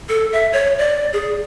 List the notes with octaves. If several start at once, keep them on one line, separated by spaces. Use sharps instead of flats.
A4
E5
C#5
D5
G#4